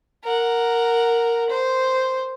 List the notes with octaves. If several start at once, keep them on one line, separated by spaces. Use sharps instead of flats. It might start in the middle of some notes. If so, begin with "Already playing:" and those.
A#4 F#5
C5